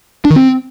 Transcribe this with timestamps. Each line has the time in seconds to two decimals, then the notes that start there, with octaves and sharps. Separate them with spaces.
0.25 D4
0.30 D#3
0.36 C4